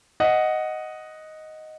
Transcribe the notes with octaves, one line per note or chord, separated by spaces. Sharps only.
D#5 F#5